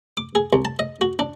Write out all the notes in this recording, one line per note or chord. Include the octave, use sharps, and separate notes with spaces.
D6
G#4
C2
A5
D#5
F#4
D4